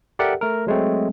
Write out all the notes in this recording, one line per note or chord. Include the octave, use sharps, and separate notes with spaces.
G4 A4 A#4 D5 E5 F#5
A3 A#4
F#3 G#3 A3 C4